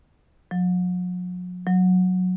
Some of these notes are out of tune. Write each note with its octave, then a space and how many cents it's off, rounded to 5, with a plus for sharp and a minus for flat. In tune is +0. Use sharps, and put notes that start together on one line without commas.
F#3 -45
F#3 -15